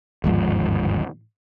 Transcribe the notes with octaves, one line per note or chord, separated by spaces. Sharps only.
G1 D#2 G#2 F3